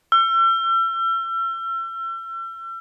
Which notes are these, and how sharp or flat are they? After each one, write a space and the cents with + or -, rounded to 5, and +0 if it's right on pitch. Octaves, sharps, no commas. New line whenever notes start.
E6 +40